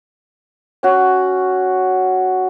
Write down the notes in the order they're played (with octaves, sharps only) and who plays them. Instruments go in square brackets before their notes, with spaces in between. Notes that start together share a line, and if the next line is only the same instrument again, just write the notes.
[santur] C#4 F#4